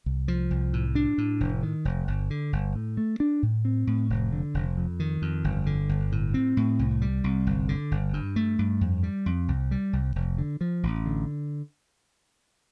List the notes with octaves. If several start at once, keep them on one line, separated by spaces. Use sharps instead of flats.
C2
F3
C2
A2
D4
A2
F1
D#3
F1
G1
D3
G1
A2
A3
D4
A2
C4
A2
F1
D3
F1
F2
D#3
F2
G1
D3
G1
A2
C4
A2
C2
G3
C2
G1
D3
G1
G2
A3
G2
F2
G3
F2
C2
G3
C2
F1
D3
F3
A1
D3